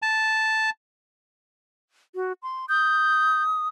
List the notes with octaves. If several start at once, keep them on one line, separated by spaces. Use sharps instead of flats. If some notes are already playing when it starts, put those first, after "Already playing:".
A5
F#4
C6
D#6 G6